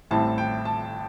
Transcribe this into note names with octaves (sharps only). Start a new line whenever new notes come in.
A1 A2 G3 C4 E4 A5
G5
A5